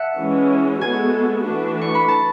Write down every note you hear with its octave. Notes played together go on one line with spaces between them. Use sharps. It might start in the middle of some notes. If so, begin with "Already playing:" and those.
Already playing: E5 F#5 A5
E3 G#3 C#4
G#3 B3 F#4 A4 G#5
E3 A3 D4 F#4 B4
C#6
B5
A5